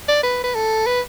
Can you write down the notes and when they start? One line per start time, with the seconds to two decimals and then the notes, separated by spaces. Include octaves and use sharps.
0.09 D5
0.23 B4
0.44 B4
0.55 A4
0.87 B4